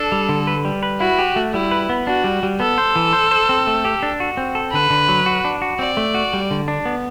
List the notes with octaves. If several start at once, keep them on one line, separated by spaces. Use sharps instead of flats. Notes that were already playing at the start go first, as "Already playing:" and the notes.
Already playing: D4 A4
G3
D3
B4
G3
B4
E4 F#4
G4
A3
G3 E4
B4
B3
D4 F#4
G3
G3
B3 A4
C5
E3
C5
C5
C4
A3
G4
D4
F#4
C4
A4
D3 B4
D3
F#3
F#4
D4
F#4
C4 D5
A3
F#4
G3
D3
D4
B3